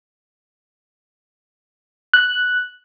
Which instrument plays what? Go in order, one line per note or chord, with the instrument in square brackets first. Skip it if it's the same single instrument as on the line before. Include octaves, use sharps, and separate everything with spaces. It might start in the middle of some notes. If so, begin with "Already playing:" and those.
[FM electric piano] F#6